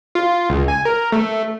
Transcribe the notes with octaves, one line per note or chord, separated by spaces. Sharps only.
F4
C#2
G#5
A#4
A3